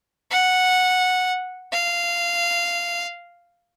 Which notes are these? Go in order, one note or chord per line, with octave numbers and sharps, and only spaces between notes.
F#5
F5